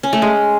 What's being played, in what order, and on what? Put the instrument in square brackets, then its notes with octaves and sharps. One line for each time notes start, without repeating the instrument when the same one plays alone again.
[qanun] C#4
A3
G#3